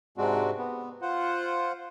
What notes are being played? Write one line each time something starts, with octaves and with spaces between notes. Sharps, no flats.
G#2 C3 G#3 C4 D4 F#4
B3
F4 C5 F#5